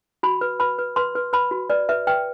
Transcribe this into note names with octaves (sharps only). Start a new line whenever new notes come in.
F#4 B5
B4
B4 B5
B4
B4 C6
B4
B4 B5
F#4
B4 D5
B4 E5
B4 G5